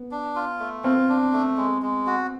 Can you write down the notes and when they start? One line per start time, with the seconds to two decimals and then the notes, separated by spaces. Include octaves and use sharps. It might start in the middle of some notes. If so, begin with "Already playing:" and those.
Already playing: B3
0.11 D4
0.35 F4
0.60 A3
0.84 C4 F4
1.09 D4
1.33 A3
1.57 G#3
1.82 G#3
2.07 F#4